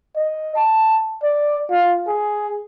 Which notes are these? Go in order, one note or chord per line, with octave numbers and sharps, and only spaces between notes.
D#5
A5
D5
F4
G#4